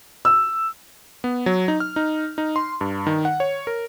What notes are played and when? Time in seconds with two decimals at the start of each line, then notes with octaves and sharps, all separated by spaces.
0.25 E6
1.24 B3
1.46 F#3
1.68 D#4
1.80 F6
1.96 D#4
2.38 D#4
2.56 C6
2.81 G2
3.07 D#3
3.25 F#5
3.40 C#5
3.67 A#4